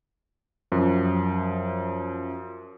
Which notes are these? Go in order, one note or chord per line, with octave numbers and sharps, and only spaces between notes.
F#2 F3